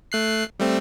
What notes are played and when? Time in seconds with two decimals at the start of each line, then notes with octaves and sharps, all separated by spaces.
0.12 A3 F#6 C7
0.60 G3 A3 C4